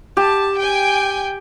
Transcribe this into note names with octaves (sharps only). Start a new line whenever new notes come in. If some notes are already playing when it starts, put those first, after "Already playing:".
G4 A5
G5 G#5